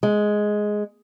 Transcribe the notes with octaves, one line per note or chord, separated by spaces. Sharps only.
G#3